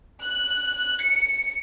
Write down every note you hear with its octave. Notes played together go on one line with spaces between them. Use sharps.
F#6
C#7